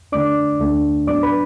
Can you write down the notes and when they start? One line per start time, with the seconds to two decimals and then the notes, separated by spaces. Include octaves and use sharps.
0.12 D3 A3 D4 D5 D6
0.60 D2 D3 A3 D4
1.07 A2 F#3 B3 D4 D5 D6
1.23 B4 B5